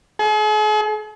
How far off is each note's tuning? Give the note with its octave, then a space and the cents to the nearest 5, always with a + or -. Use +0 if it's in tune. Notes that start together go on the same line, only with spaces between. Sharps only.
G#4 +45